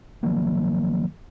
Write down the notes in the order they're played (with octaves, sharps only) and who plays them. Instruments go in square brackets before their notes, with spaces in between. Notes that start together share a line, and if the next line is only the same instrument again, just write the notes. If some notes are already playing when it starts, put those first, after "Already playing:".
[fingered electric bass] D#3 F3 F#3 A#3